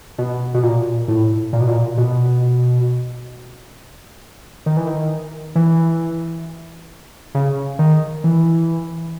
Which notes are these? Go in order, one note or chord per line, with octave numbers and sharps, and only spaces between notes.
B2
B2
A#2
A2
A#2
B2
A#2
B2
D#3
E3
D#3
E3
C#3
D#3
E3